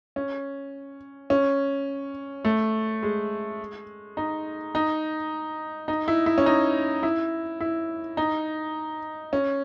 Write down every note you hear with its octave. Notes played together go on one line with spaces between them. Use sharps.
C#4
C#4
A3
G#3
D#4
D#4
D#4
E4
E4
C#4
D#4
E4
E4
D#4
C#4